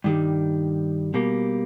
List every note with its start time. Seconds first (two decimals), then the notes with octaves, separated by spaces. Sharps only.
0.04 G2 D#3 G3
1.14 B2 G3 A#3